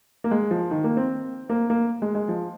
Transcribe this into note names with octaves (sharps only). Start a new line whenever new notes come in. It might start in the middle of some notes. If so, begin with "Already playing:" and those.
A#3
G#3
F3
D#3
A#3
C4
A#3
A#3
G#3
G#3
F3